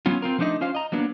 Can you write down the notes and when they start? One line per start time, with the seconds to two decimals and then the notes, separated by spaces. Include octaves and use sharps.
0.06 F#3 B3 C#4 F4
0.22 C4 F4 A#4
0.38 F3 A3 B3 D4 D#4 D#5
0.61 C#4 F4 C5 F5
0.75 D#5 A#5
0.92 F#3 A#3 B3 D4